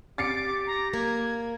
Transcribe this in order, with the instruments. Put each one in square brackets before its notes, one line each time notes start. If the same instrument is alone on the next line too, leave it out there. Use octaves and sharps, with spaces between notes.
[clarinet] G4 [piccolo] D6 [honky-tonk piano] A6 C7 C#7
[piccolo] A#5
[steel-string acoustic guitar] A#3 [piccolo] G#6